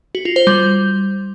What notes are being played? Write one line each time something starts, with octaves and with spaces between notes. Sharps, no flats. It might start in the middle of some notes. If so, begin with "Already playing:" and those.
F#4
F4
C5
G3